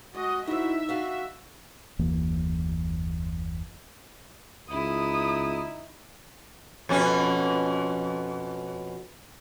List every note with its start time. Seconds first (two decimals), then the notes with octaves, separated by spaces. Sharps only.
0.15 G#3 F#4 D#5
0.47 D#4 E4 F#4 C5 E5
0.89 D4 F#4 D#5 F5
1.99 F#1 D#2 E3 A#3
4.70 C#2 D#4 E4 D#6
6.89 F2 B2 C#4